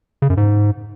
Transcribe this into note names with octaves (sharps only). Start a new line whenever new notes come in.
C#3
F#2
G#2